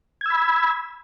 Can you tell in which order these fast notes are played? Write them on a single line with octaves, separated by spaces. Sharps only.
G#6 E6 B5